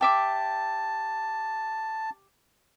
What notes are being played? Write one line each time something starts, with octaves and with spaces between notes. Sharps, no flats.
G4 E5 A5 D6